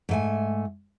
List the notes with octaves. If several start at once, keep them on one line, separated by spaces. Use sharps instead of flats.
G#2 A3 G#5